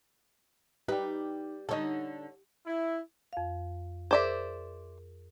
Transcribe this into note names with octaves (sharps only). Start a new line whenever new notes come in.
G3 D#4 G4 B4
D3 D#4 A4 C#5 D#5
E4
F2 F5
G#4 A#4 C5 D5 E5